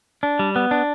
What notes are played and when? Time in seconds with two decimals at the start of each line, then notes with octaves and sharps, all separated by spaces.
0.23 D4
0.39 G3
0.56 B3
0.71 D4